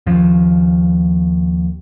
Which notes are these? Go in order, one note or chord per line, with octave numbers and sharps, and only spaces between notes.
D#2 F3